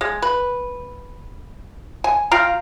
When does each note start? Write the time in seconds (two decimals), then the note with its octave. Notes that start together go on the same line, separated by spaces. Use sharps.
0.01 G#3
0.22 B4
2.04 G#5
2.31 F4 F5 G5 A#5